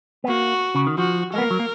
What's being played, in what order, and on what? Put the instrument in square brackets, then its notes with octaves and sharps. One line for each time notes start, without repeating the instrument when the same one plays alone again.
[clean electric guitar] B3
[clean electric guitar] A#3 [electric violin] F#4
[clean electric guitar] C#3
D#3
[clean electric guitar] F3 [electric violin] F#4
[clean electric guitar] G#3 [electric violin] A#4
[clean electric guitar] B3
A#3
F#3
A#3